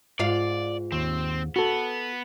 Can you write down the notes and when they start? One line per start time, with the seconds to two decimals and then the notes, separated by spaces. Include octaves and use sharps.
0.19 G#2 F4 D5 F5
0.92 D#2 C4
1.56 B3 F#4 A4